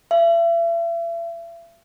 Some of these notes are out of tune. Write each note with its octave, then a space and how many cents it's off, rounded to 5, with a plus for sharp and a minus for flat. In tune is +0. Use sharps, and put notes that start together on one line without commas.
E5 +40